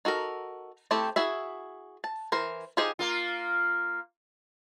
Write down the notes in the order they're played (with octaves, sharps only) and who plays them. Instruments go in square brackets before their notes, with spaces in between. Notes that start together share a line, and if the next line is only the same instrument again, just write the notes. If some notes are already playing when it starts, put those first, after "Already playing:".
[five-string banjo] D#4 F#4 A4 A#4
A3 C4 E4 G4 A4
E4 F#4 G#4 E5
A5
E3 A#4 C5
D#4 F4 G4 G#4 C5
[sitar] A#3 F4